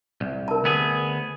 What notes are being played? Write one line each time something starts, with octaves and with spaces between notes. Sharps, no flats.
C2
A#4 A5
D2 B3 G#4